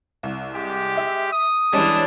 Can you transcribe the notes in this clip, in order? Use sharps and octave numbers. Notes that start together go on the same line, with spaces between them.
C2
G#3 G4
E5
D#6
E3 G3 G#3 C#4 D4